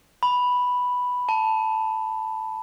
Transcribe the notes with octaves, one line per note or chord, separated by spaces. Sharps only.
B5
A5